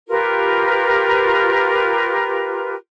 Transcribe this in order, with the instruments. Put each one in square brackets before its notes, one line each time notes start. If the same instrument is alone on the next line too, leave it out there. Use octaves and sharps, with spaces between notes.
[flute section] F4 G4 A#4 B4